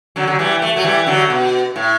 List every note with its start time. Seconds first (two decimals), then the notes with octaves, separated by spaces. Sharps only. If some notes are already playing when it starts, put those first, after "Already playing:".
0.16 D3 F#3
0.27 D3 F#3
0.39 E3 G3
0.62 A3
0.76 F#3 A3
0.84 E3 G3
1.07 D3 F#3
1.30 B2
1.76 A2